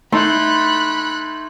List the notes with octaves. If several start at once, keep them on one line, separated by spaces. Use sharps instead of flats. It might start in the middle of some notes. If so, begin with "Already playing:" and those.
A3 D#4 E4 B5 C6 F#6